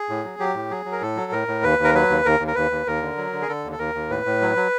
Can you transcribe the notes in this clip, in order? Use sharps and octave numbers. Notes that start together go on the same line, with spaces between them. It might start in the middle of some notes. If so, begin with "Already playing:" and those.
Already playing: G#4
A2
F#3
F#3 G4
A2
F#3 G#4
F#3
A#4
A2 A4
F#3
A2 A#4
A2
D#2 B4
D#2
A#4
F#3 B4
D#2
D#2 A#4
D#2
A#4
D#2 B4
D#2
D#2 A#4
D3
F#3
D3
G#4
D3 A4
D#2
A4
D#2 A#4
D#2
A2 B4
A2
F#3
F#3